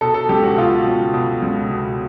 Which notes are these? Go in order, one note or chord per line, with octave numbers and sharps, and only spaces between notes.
B2 A4
A4
C#2 G4
F#4
B2 F4
C#2
B2
C#2
B2